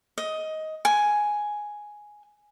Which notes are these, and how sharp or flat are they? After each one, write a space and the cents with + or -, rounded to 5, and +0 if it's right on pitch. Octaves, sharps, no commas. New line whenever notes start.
D#5 +15
G#5 +5